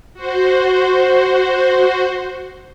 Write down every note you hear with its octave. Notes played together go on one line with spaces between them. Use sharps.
F#4 C5